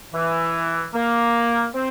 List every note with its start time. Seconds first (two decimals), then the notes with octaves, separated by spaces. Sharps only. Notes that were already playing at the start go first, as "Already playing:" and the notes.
0.14 E3
0.94 A#3
1.75 C4